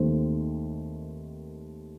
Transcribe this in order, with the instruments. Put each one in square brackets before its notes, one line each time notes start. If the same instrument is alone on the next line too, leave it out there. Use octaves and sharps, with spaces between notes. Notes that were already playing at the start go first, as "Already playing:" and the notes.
Already playing: [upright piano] D#2 D#3 A3 C4 C5